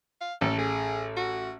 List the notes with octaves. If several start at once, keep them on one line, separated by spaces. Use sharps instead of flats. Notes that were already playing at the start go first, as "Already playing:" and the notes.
F5
A1 A4
G#4
F#4